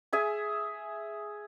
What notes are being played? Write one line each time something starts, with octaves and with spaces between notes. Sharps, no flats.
G#4 E5 G#5